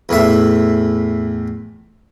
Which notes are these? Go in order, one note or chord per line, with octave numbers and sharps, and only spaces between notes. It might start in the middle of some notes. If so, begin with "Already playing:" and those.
E2 A2 E5